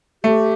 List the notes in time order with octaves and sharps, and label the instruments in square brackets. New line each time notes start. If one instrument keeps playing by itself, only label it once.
[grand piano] A3 [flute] G4